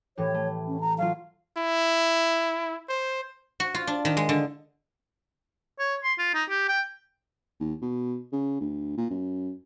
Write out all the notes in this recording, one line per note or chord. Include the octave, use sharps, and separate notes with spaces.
A2 E3 G4 C#5
A3
C#4
A#5
F#3 F4 F5
E4
C5
F#4
F4
D4
D#3
G#3
D3
C#5
C6
F4
D#4
G4
G5
D#2
B2
C#3
D2
A#2
F#2